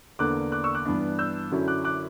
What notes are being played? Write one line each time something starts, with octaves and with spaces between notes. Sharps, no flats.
E2 D3 A#3 D4 D6 F#6
D6 F#6
C#6 E6
D6 F#6
G2 E3 B3 D4
E6 G6
F#2 D3 F#3 C#4 E4
D6 F#6
D6 F#6